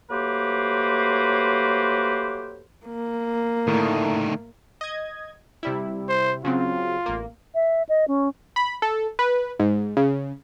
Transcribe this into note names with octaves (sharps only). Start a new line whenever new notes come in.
F#3 A3 A#3 G4 B4 C5
A#3
A2 D3 D#3 A3
D#5 G#6
C3 G3 E4
C5
C#3 F#3 C4 F4
A1 A#3
E5
D#5
C#4
B5
A4
B4
G#2
C#3